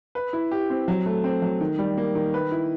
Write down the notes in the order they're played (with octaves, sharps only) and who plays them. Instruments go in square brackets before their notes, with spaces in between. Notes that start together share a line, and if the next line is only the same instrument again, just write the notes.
[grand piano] B4
E4
G4
C4
F#3
A3
C4
F#3
D#3
G3
A#3
D#3
B4
E4